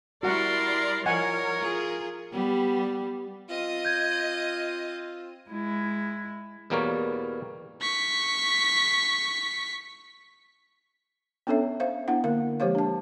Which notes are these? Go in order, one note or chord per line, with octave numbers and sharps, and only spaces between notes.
G3 E4 F#4 A#4 D5 F#5 C6
F3 A#4 C#5 D#5 F#5 G#5
F4 G#4
G3 B3
C4 F4 D#5 D#6
G6 G#6
G#3 E4
E2 B2 G3 A#3 A#4 C#5
C#6 B6
B3 C#4 D4 A4 C#5 E5
C5 E5 F5
B3 D4 E4 F#5
D3 A#3 A#4 F5
F3 G#3 G4 C5 C#5 F5
D4 A5